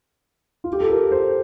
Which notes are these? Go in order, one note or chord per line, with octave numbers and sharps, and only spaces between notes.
F4
G4
A4
A#4
C5